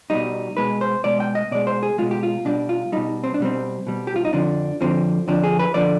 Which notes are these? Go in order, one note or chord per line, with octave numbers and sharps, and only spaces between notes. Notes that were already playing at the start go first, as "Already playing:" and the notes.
B2 G3 D#4
B2 G#3 B4
C5
B2 G#3 D5
G5
D#5
B2 G#3 D5
C5
G#4
B2 G#3 F4
G4
F4
B2 G3 D4
F4
B2 G3 D#4
C4
D4
B2 G3 C4
B2 G3
G4
F4
D#4
F2 D3 F3 D4
F2 D3 F3 C4
F2 D3 F3 D4
G#4
B4
D3 F3 D5